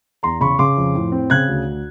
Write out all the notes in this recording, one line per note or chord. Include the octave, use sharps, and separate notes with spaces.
E2 A#5 C6
C#3 B5 C#6
C#3 C6 D6
F2
A2
C4
C#3 F#6 G#6
D2